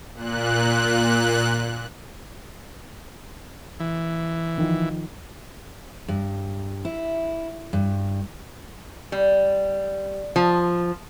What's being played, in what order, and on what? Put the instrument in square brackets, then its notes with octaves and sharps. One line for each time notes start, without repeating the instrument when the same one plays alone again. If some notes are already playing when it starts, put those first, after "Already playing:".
[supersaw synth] A#2 F#6
[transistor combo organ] E3
[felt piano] D#3 F3
[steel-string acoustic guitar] G2
E4
G2
[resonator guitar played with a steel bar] G3
F3